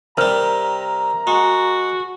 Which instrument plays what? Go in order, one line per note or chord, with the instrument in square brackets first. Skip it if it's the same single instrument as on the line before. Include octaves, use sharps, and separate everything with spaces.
[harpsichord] C3 G3 [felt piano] A#4 F6 [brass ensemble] A#5
[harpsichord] G#3 [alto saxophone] F#4